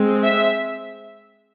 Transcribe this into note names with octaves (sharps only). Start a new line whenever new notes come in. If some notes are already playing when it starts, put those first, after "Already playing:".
Already playing: G#3 C4
E5